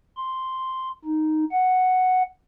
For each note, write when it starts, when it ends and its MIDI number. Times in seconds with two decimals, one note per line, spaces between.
0.17 0.89 84
1.05 1.45 63
1.51 2.23 78